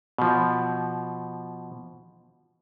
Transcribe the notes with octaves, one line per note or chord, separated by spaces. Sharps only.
B2 F3